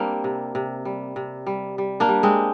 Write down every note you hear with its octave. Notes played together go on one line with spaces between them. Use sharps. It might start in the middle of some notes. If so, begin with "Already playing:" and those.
Already playing: G3 A#3 C4 D4
C3
C3
G3
C3
G3
G3
A#3 D4
G3
G#3 C4